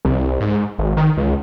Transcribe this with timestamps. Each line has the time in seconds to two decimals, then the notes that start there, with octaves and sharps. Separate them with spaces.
0.05 C2
0.40 G#2
0.79 G#1
0.97 D#3
1.17 C#2